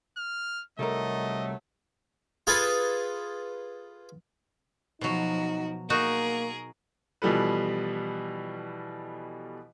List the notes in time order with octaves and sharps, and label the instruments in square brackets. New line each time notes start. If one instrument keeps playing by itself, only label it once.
[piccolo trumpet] F6
[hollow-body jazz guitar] C2 G3 A#4 [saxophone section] D#3 F#3 A3 [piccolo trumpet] D#5
[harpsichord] F4 G#4 A4 B4
[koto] B2 F#3 [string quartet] F3 F#4 [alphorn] D#4
[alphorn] A#3 [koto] D#4 F#4 [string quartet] G#4 A#4
[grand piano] B2 E3 F3 G3 A4 B4